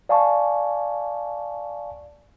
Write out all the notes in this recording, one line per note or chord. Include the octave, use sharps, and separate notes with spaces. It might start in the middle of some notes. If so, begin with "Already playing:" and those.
D5 F5 G#5 A5 C#6